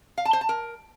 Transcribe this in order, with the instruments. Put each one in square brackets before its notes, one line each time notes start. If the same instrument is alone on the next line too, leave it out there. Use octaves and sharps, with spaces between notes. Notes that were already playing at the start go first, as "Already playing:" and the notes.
[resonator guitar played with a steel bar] F5
A5
C5
A5
A#4